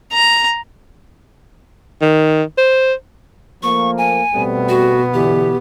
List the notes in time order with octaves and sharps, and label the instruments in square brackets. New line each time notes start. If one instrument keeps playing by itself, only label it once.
[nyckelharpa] A#5
[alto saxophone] D#3
C5
[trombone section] F3 A3 A#3 [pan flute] C#6
[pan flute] G#5
[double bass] B2 B3 [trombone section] G3 A3 C4
[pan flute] F#4
[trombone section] D3 E3 [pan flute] G4